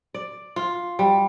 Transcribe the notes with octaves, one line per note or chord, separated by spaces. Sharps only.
D5
F4
G3